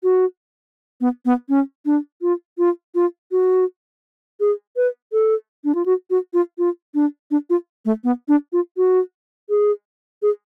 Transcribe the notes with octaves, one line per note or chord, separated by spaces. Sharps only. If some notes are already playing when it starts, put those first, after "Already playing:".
F#4
B3
B3
C#4
D4
F4
F4
F4
F#4
G#4
B4
A4
D4
F4
F#4
F#4
F4
F4
D4
D4
F4
A3
B3
D4
F4
F#4
G#4
G#4